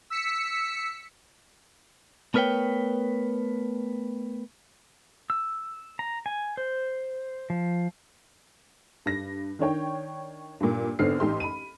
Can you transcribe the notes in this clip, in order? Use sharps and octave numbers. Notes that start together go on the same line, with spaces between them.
E6 B6 C#7
A3 B3 A#4 B4 C#5 G5
E6
A#5
G#5
C5
F3
G2 A#6
D#3 D4 C#5 G5
G2 A#2
G#1 D3 B3 C5 F6 C7
A1 D#4 G4 C6
B5 D#7